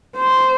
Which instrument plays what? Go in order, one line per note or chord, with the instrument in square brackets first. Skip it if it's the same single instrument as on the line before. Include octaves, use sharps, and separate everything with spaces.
[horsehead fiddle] C5